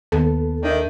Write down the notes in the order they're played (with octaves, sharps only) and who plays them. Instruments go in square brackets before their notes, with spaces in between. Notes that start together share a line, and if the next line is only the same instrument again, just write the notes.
[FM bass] D#2 [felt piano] B3 [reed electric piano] A4
[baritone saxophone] D#3 [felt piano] D4 E5